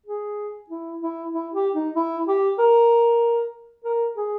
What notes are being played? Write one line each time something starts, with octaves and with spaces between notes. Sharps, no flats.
G#4
E4
E4
E4
G4
D#4
E4
G4
A#4
A#4
G#4